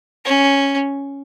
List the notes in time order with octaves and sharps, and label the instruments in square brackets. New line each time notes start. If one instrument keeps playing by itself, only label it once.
[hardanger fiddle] C#4